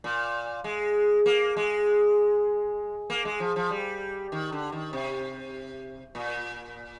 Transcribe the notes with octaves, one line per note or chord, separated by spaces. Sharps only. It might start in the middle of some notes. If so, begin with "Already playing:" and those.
A#2
G#3
A#3
G#3
A#3
G#3
F3
F3
G3
D#3
D3
D#3
C3
A#2